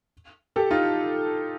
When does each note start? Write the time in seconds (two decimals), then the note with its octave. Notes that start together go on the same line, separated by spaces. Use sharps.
0.56 G4 A4
0.71 D#4 F4